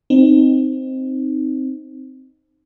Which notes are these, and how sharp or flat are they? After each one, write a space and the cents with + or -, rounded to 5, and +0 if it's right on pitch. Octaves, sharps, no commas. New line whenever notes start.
C4 +0 D#4 -5